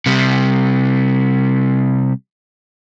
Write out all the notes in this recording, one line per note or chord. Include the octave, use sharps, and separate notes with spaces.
C3 G3